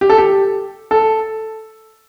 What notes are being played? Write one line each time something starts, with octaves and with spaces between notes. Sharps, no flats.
G4
A4
G4
A4